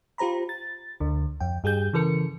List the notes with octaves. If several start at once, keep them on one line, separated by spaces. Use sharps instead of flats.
F4 G4 C5 A#5 B5
A6
D2 D3
F2 G5
G2 G4 G#4 G6
C#3 E3 A4 A#4 C#7